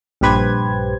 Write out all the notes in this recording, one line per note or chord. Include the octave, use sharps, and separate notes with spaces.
A#1 G2 G4 B4 C5 G#6